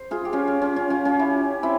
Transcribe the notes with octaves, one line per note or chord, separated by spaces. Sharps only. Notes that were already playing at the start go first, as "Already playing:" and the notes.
Already playing: C5
F4 G#4
G4
C#4 F4
C#4
C#4
C#4
C#4 F4
C#4 F4
E4 G4
C4 E4